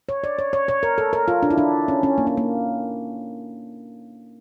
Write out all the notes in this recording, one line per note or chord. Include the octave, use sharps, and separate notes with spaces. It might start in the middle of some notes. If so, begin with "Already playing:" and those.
C#5
D5
C#5
C#5
C#5
A#4
A4
A#4
F4
D4
E4
D4
C#4
C#4
A#3
C#4
A#3